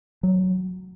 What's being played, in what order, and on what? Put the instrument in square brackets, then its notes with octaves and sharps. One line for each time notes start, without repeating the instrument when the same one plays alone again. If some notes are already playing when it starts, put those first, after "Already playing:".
[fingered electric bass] F#3